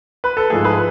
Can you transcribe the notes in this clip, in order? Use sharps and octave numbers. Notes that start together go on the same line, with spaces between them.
B4
A4
G#2 F3 A3 G#4
G#4 B4